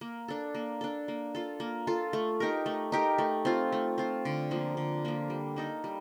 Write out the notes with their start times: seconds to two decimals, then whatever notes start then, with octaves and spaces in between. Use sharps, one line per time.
0.01 A#3
0.28 D4 A4
0.55 A#3
0.81 D4 A4
1.08 A#3
1.35 F4 A4
1.60 A#3
1.87 F4 A4
2.13 A3
2.40 D#4 G4 A#4
2.66 A3
2.92 D#4 G4 A#4
3.18 A3
3.45 C4 F4
3.72 A3
3.98 C4 F4
4.25 D3
4.51 F3 A#3
4.77 D3
5.05 F3 A#3
5.30 G3
5.56 A#3 D#4 A4
5.84 G3